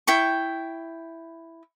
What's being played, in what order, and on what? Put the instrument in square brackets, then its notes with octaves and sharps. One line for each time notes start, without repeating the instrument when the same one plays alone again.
[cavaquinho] E4 G5 C#6